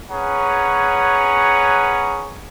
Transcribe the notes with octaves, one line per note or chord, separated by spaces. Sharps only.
C#4 G#4 B4 C#5 F#5 A#5